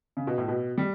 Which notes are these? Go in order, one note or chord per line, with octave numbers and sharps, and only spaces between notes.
C#3
B2
A2
B2
G3